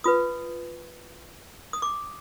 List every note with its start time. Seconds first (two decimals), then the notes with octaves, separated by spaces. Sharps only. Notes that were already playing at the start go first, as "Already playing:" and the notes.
0.04 F4 B4 D#6
1.73 D#6
1.82 D6